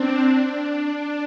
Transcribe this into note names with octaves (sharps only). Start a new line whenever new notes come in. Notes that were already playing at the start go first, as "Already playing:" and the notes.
Already playing: C4 D4
D4
D4